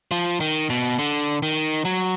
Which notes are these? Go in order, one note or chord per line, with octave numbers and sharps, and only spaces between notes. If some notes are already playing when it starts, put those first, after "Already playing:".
F3
D#3
B2
D3
D#3
F#3